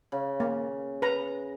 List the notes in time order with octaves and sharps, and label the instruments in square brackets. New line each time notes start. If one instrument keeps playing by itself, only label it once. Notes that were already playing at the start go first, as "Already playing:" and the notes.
[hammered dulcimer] C#3
[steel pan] A#3
B4 A#5